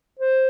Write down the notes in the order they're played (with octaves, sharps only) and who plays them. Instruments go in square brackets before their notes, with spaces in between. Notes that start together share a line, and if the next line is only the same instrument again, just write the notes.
[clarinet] C5